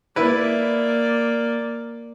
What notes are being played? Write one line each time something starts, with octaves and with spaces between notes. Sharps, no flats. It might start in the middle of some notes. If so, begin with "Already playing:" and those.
A#3 E4 B4 D5